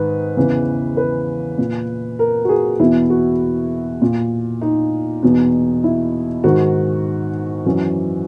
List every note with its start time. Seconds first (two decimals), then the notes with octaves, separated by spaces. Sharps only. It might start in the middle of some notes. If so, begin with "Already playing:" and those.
Already playing: G#2 D#3 B4
0.37 E2 C#3 E3
0.97 B4
1.58 A#2
2.19 A#4
2.45 F#4
2.49 G#4
2.80 E2 B2 E4
3.10 F#4
4.02 A#2
4.62 D#4
5.23 E2 B2
5.84 E4
6.44 G#2 D#3 F#4
7.66 F#2 E3 F#4